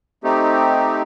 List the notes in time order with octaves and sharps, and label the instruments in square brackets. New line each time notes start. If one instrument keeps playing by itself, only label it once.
[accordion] A3 C4 D#4 G4